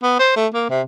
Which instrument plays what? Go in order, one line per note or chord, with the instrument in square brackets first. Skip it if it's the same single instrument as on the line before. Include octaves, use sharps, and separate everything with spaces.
[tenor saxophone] B3
C5
A3
A#3
C3